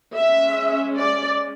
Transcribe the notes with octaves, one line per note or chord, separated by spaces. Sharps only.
G#3 C#4 E5
D5